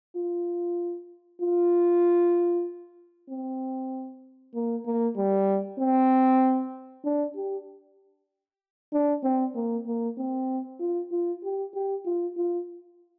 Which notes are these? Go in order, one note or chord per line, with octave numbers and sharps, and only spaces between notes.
F4
F4
C4
A#3
A#3
G3
C4
D4
G4
D4
C4
A#3
A#3
C4
F4
F4
G4
G4
F4
F4